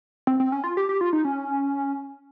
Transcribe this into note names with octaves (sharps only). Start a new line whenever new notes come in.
C4
C4
C#4
F4
G4
G4
F4
D#4
C#4